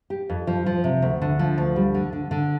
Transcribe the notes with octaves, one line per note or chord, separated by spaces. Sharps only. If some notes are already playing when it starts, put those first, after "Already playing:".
G4
F2
F3
F3
C3
D2
D3
F3
D2
G3
D3
D3
D3